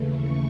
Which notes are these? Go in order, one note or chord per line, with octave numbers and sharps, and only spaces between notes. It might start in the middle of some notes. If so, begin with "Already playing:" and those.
Already playing: D#2 C#3 E3 A3
C#6